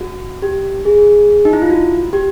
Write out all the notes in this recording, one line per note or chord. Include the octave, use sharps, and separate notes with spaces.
F#4
G4
G#4
D#4
E4
F4
F#4
G4